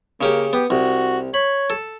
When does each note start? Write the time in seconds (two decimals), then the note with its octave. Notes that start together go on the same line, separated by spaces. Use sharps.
0.21 C#3 A#3 C#4 G4
0.53 B3 G4
0.70 C2 F#4
1.34 C#5 B5
1.70 A4